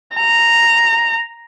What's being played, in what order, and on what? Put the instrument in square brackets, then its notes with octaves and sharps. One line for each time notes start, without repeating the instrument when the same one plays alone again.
[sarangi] A#5